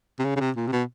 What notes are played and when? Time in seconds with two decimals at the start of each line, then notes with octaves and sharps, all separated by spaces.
0.19 C3
0.24 C#3
0.36 C#3
0.40 C3
0.56 A#2
0.67 C3
0.72 B2